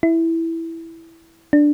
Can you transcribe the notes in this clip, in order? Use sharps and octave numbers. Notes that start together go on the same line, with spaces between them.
E4
D4